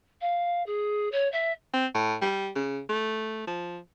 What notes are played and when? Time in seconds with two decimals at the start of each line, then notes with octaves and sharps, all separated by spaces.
0.21 F5
0.66 G#4
1.12 C#5
1.32 E5
1.74 C4
1.95 A2
2.22 G3
2.56 C#3
2.90 A3
3.47 F3